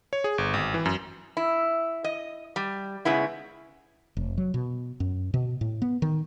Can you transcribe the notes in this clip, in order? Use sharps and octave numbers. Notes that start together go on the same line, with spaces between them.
C#5
G#4
G1
G#1
E3
F#2
E4
D#5
G3
G#2 C#3 B3 E4
F1
F#3
B2
F#2
B2
A2
B3
D#3